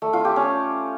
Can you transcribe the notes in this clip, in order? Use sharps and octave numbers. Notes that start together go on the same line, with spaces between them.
A3
F4
G4
C#4